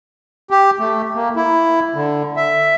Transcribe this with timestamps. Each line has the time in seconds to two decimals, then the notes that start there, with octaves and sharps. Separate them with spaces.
0.51 G4
0.79 A3
1.15 A#3
1.36 E4
1.95 D3
2.36 E5